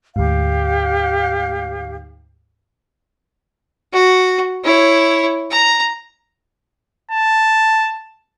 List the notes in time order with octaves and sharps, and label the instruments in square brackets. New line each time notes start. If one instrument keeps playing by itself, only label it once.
[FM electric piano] D2 G#2 [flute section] G4 F5
[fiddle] F#4
E4 C#5
A#5
[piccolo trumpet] A5